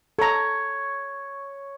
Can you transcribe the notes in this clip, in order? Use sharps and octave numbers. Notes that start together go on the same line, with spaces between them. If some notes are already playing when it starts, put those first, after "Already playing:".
A4 C#5 A#5